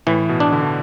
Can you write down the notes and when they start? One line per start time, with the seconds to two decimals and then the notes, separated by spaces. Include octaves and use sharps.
0.07 A2 E3
0.29 B2
0.40 D4
0.52 D3